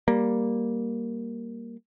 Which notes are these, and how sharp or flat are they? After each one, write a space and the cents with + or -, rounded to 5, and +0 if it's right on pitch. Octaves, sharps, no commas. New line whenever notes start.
G3 +0 A#3 +0